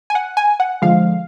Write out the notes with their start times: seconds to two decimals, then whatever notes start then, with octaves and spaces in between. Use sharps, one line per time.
0.10 G#5
0.15 F#5
0.37 G#5
0.60 F#5
0.82 D3 F3 G#3 F5